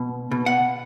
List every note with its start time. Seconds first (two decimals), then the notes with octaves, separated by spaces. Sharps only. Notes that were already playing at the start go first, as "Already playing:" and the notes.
Already playing: B2
0.31 B2
0.46 F#5